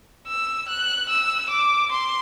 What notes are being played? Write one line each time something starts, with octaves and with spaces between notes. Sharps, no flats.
E6
F#6
E6
D6
C6